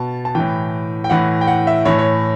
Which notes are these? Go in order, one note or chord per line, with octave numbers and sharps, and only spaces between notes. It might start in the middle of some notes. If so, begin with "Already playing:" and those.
Already playing: B2 A5
A5
A2 E3 G5
G5
A2 E3 F#5
G5
F#5
E5
A2 E3 C#5
C#5